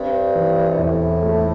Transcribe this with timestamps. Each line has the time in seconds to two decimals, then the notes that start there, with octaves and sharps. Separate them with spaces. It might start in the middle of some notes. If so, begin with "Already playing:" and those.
Already playing: G2 C4
0.35 E3
0.70 C3
0.79 E2 A2
1.23 A3